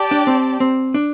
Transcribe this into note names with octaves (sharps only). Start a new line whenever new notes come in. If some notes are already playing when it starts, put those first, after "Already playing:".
Already playing: G4 D5 A5
D4
C4
C4
D4